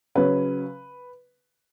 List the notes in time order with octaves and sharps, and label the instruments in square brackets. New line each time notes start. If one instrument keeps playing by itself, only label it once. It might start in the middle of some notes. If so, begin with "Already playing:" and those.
[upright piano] C#3 F#3 C#4 B4